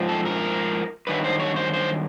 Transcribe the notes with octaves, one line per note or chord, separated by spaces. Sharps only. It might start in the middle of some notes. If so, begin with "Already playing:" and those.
Already playing: G#2 F3
A4
A#4
G2 D#3 F#3 B4
C5
C#5
C5
C5